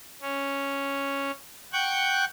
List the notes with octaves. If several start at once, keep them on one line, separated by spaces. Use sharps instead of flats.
C#4
F#5 G5 C#6 F#6 G6